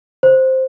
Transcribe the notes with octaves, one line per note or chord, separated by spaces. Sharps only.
C5